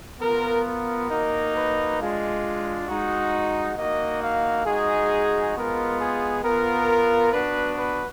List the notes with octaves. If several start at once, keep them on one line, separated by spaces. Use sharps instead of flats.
B3 F4 A#4
A#4
A#3 D#4 F#4
B4
G#3 D4 F4
G#3 D#4 F#4
A#3 D#4 F#4 D#5
F5
G#3 D#4 F#4 G#4
G#3 B3 F4 A#4
G#4
B3 F4 A#4
B3 D4 F#4 B4
B4